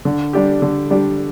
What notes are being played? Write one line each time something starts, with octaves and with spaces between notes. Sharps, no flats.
D3
G3 D4 G4
D3
G3 D4 G4